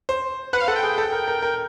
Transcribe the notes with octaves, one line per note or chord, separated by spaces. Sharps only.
C5
B4 F#5
F5
A4 F#5
G5
G#4
A4
A#4
A#4
A#4